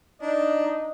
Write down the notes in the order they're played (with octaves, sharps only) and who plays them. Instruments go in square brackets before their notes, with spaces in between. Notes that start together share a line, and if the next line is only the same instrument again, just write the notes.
[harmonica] D4 [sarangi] D#4